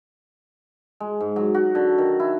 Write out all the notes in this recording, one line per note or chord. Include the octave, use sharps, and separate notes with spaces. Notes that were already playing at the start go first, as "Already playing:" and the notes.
G#3
G#2
F#3
F#4
D3
D#3
E4